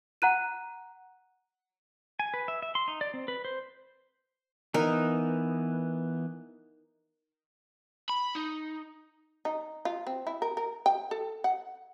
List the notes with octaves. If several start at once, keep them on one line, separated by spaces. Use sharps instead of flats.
F#5 A#5 F#6 D#7
G#5
B4
E5
E5
C6
D#4
D5
C4
B4
C5
E3 B3 D#4 A#4
B5
D#4
D#4
F4
C4
E4
A#4
A#4
G5
A4
F#5